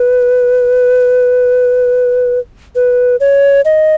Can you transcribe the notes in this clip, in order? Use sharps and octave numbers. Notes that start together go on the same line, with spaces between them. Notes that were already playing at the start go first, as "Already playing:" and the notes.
Already playing: B4
B4
C#5
D#5